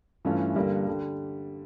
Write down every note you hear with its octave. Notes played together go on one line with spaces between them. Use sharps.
G2 E3 A3 C#4 F4
G2 D3 G3 A#3
D3 G3